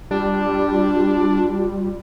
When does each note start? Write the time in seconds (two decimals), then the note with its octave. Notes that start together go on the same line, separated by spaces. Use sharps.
0.11 G3 D4 F4